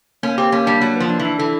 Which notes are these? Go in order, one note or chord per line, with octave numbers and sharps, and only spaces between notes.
A#3 C#4
C4 G4
A#3 C#4
G3 D4
F#3 A#3
F3 B4
D4
E3
D4
E3 A4